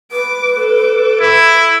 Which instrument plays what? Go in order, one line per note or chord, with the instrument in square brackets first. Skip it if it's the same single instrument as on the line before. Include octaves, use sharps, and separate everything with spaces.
[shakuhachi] B4 [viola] D6
[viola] A4 D6
[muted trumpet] E4